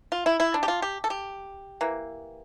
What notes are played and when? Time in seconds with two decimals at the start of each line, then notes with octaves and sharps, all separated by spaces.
0.12 F4
0.26 E4
0.40 E4
0.54 D4
0.63 G4
0.68 F4
0.82 G4
1.04 A4
1.10 G4
1.81 E3 A#3